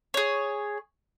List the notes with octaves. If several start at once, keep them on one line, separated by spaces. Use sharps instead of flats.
G#4 C#5